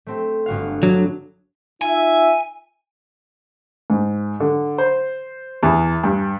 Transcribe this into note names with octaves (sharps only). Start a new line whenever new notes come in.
A3 C4 G4
G1 F#4 F5
F#3 D4
D#4 F4 E5 G#5
G#2
D3
C5
E2
G2